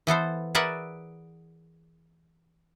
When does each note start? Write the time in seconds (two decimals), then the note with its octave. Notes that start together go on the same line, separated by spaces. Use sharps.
0.07 E3 B3 A4 C5
0.55 G#4 A#4 B4 D5 E5 F#5